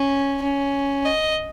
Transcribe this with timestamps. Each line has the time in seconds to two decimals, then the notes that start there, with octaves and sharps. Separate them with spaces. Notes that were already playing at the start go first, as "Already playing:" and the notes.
Already playing: C#4
0.43 C#4
1.05 D#5